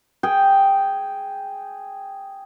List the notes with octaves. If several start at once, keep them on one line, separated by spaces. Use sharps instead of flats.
G#4 G5